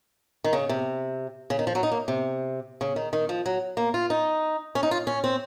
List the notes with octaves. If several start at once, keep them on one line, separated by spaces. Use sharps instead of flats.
D#3
C#3
C3
C#3
D#3
F3
F#3
D#4
A#3
C3
C#3
D#3
D#3
F3
F#3
A#3
F4
D#4
C#4
D#4
F4
C#4
C4